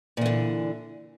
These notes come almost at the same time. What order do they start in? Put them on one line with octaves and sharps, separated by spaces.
A#2 E3 D3